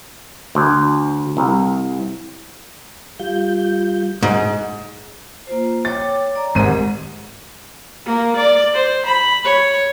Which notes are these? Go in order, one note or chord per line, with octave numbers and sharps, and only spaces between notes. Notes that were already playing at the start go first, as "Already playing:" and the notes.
D2
C2
G3 F4 G6
G#2
A#3 F4 C5
C#5 G5 D6 A6
D5 A#5
G#1 G#2 G4 G#4 A#4 D#7
A#3
D5
C5
B5
C#5